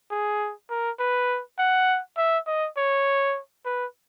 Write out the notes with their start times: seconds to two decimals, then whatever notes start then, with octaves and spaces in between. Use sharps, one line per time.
0.11 G#4
0.70 A#4
0.99 B4
1.59 F#5
2.17 E5
2.47 D#5
2.77 C#5
3.65 B4